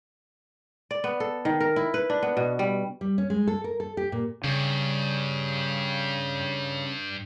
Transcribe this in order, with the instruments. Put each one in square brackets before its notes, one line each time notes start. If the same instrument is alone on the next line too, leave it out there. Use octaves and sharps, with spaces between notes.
[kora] D5
B3
A4
D#3
A#4
E4
B4
D4
B3
B2
G3
[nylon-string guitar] G3
C#4
G#3
A4
A#4
A4
G4
A#2
[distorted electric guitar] G2 [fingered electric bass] C#3